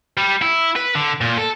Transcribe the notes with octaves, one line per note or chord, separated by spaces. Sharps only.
G3
E4
B4
D3
A#2
A4